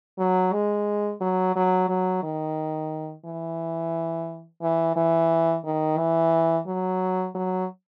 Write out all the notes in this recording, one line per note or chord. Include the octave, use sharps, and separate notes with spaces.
F#3
G#3
F#3
F#3
F#3
D#3
E3
E3
E3
D#3
E3
F#3
F#3